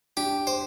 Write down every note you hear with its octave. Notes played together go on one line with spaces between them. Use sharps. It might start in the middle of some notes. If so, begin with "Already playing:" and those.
D4 G4
C5